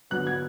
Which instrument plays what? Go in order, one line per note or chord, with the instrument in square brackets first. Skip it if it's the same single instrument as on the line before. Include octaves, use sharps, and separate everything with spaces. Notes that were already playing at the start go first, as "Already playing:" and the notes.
[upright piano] D3 F#3 B3 F#6
G#6